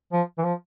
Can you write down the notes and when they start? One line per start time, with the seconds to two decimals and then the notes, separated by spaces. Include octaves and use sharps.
0.12 F3
0.38 E3
0.44 F3